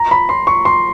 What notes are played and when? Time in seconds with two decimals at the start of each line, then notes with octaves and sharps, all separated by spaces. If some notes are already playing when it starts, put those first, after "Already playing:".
Already playing: A#5
0.11 B5
0.29 C6
0.47 C#6
0.65 C6